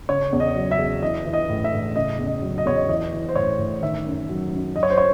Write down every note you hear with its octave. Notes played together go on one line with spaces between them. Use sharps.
C#3 C#5
E2
D#5
F#3
E5
E2
E3 D#5
E3
D#5
A2
E5
A2
C#3 D#5
E2
D#5
F#3
D#5
E2 C#5
D#5
E3 D#5
E3
C5
A2 C#5
A2
D#3 E5
F#2
F#3
F#2
F#3 D#5
C#5
C5
C#5